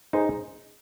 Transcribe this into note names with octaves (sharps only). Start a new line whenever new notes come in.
D#4 G#4 C5